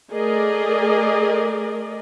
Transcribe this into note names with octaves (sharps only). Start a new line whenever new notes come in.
A3 G#4 A#4 D5 D#5